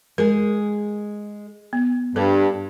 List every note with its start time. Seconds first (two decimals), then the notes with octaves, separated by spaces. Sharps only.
0.18 G#3 G#4 A#4
1.73 B3
2.16 G2 A4 B4 D5